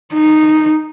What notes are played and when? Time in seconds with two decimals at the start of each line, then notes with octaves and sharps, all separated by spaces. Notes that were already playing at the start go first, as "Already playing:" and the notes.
0.13 D#4